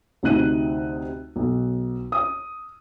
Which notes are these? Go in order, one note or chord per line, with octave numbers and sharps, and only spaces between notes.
D2 C3 D#4 F#6 D#7
B1
D#6